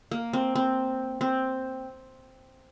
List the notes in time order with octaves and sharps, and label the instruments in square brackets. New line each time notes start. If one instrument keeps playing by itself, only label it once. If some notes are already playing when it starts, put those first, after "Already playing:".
[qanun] A#3
C4
C4
C4